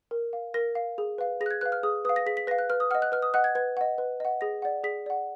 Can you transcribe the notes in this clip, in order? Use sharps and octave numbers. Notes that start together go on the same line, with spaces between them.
A#4
F5
A#4 A#6
F5
G#4
B4 F5
G#4 A#6
F#6
G#6
B4 F5 F#6
F6
G#4 D#6
B4 F5 D#6
A#6
G#4 B6
B6
B4 F5 A#6
F#6
B4 F6
D#6
D#5 F#5 F6
F#6
B4 F6
D#6
D#5 F#5 F#6
G#6
B4 G#6
D#5 F#5
B4
D#5 F#5
G#4 A#6
D5 F#5
G#4 B6
D5 F#5